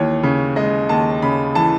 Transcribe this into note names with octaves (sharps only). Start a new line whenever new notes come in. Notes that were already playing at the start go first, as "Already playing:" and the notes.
Already playing: D#2 E3 C#5
C#3
G#3 D#5
D#2 A5
C#3 B5
E3 A5